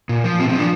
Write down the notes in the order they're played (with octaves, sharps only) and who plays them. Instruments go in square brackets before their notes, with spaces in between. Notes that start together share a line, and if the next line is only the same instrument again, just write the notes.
[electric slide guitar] A#2
F3
A#2 C4
C4
F3 D4